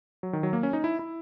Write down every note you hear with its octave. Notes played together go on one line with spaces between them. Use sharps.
F#3
D#3
F#3
A#3
C#4
D#4
E4
E4